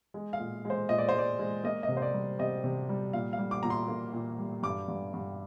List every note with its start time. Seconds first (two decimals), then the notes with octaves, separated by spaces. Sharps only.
0.14 G#3
0.33 F5
0.39 A#2
0.65 G#3
0.70 C5
0.89 A#2 D#5
0.98 D5
1.09 C5
1.14 G#3 D5
1.39 G#3
1.64 A#3 D#5
1.83 D#5
1.88 C3
1.97 C5
2.02 D5
2.14 G3
2.39 C3 D#5
2.64 C3
2.89 G3
3.13 A#2 F5
3.33 F5
3.39 G3
3.51 D6
3.63 A#2 A#5
3.70 C6
3.88 A#3
4.13 A#2
4.39 G3
4.63 G2 D6
4.88 G2
5.14 G2